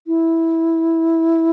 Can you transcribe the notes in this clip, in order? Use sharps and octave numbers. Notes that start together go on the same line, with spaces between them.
E4